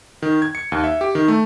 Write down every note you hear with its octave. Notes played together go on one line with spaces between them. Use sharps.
D#3
G#6
C#7
D#2
E5
G4
D#3
A3